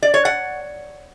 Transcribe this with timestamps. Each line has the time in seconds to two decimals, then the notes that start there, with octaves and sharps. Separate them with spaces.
0.03 D5
0.14 C#5
0.25 F#5